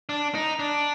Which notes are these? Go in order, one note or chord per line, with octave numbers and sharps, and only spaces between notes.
D4
D#4
D4